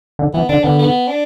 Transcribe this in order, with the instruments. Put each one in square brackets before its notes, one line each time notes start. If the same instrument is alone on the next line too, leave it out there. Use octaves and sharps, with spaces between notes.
[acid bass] D3
[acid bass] E3 [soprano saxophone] B3
[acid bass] D3 [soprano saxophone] D4
[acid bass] D3 [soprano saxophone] B3
[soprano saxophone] B3
D4